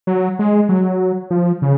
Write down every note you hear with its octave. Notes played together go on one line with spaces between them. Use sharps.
F#3
G#3
F#3
F3
C#3